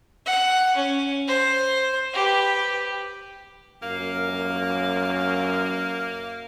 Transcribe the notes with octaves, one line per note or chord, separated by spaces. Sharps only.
F#5
C#4
C5
G4 B4
F#2 A#3 F5